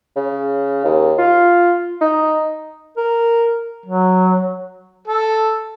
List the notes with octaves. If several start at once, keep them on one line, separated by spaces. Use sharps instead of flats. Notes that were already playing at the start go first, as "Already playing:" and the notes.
C#3
D#2
F4
D#4
A#4
F#3
A4